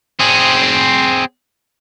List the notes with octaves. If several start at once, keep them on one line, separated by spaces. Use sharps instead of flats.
C4 G#4